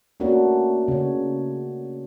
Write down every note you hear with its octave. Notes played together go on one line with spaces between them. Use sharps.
A3 A#3 C#4 D4 F#4
C#3 C#5